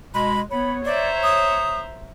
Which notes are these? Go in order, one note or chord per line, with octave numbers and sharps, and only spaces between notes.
B2 G#3 B5
B3 C#5 B5
C5 D5 E5 A#5
D#6